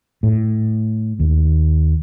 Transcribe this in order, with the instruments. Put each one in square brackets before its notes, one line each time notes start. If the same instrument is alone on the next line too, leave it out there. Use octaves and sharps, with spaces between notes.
[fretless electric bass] A2
D#2